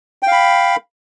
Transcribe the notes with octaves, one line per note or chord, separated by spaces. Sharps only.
F5 G5 B5